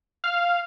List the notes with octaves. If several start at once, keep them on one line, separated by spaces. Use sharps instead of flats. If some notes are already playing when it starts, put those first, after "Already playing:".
F5